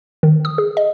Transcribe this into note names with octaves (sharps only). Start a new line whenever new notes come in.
D#3
D#6
G#4
D#5